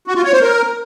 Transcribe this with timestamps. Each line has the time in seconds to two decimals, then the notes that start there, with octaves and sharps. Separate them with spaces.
0.07 F#4
0.16 F4
0.24 C#5
0.33 C5
0.41 A#4